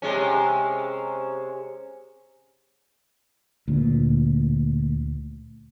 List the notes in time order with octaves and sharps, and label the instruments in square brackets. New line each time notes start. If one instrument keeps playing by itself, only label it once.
[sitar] C3 G#3 C#4
[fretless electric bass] D2 A#2